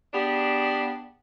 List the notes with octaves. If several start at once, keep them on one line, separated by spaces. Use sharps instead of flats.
B3 D4 G4 G#4